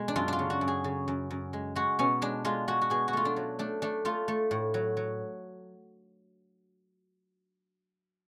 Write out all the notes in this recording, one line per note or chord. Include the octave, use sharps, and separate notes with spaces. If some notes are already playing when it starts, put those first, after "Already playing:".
Already playing: B2 G#3
D4
F#2 F4
D4 F4
C#3
F#4
F#2
G#4
C#3
F#2
F#2
G#3
G#3 F#4
B2 C#4
G#3 D4
G#3 F4
G#3 F#4
F#4
B2 G#4
F#4
A3 F4
D4
F#3
A3 D4
A3 D4
A3 F4
A3
A2
F#3
F#3